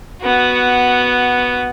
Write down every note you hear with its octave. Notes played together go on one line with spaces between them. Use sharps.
B3 F#4